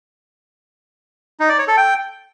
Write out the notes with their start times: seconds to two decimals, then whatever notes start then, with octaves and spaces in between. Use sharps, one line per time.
1.40 D#4
1.49 D5
1.59 C#5
1.68 A4
1.77 G5